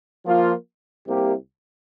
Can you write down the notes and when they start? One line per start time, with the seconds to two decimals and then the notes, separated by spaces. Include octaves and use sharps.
0.25 F3 A#3 F4
1.06 C2 C3 A#3 G4